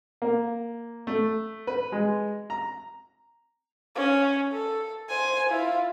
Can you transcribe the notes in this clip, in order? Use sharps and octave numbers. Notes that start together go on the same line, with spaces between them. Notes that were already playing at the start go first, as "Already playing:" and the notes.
A#3
A3
B4
G#3
A#5
C#4
A4
C5 G#5
E4 F4